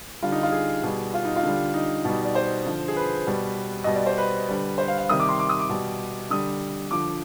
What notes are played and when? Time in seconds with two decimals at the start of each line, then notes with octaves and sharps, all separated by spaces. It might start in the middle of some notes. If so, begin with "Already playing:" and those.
0.22 D3 G3 F4
0.32 D#4
0.43 F4
0.52 G#4
0.83 B2 G3
1.14 F4
1.25 D#4
1.36 F4
1.43 D3 G3
1.74 D#4
2.05 B2 G3
2.25 D5
2.35 C5
2.66 D3 F3
2.88 G#4
2.96 B4
3.27 B2 G3
3.84 B2 G3 D#5
3.96 D5
4.06 C5
4.18 B4
4.48 D3 G3
4.78 C5
4.88 F5
4.98 F5
5.09 C3 D#3 G3 D#6
5.20 D6
5.29 C6
5.39 D6
5.49 D#6
5.59 D6
5.70 B2 G3
6.30 D3 G3 D#6
6.91 D3 F3 D6